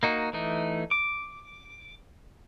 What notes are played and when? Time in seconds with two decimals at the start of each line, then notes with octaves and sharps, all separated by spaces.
0.03 A#3 D#4 F#4
0.33 E3 A3 D#4
0.91 D6